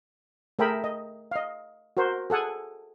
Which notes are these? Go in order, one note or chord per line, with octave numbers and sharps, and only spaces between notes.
A3 G#4 A#4 E5 G5 B5
D#5
D#5 F5
F#4 A#4 C5
G#4 A4 F#5 G#5